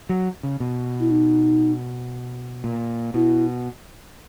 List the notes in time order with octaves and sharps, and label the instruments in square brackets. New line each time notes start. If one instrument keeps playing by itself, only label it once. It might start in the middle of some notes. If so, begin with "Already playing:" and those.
[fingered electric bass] F#3
C#3
B2
[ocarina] E4
D#4
[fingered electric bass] A#2
[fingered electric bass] B2 [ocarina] E4